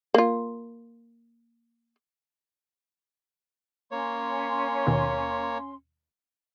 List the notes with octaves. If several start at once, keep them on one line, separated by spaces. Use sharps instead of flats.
A#3 F4
A#3 C#4 C#5 C6
D#2 B2